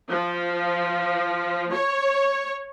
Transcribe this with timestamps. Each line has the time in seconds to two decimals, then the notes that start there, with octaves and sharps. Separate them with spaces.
0.11 F3
1.74 C#5